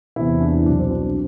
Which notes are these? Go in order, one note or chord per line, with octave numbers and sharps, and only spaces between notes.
E2 C3 E3 E4
D4
C2 B2 F#3 D4
C4
D4
C4